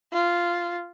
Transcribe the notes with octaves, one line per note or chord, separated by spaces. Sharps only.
F4